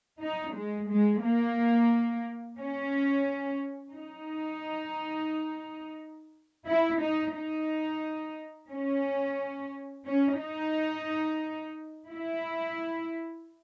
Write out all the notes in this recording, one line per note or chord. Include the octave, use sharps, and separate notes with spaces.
D#4
G#3
G#3
A#3
C#4
D#4
E4
D#4
D#4
C#4
C#4
D#4
E4